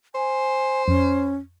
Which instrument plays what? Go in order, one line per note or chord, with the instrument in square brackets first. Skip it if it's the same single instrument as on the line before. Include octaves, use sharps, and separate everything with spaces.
[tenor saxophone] C5 [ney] G#5
[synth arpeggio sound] F2 [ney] C#4